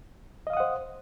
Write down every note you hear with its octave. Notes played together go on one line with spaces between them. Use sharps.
C5 D#5 F5 F#5 D#6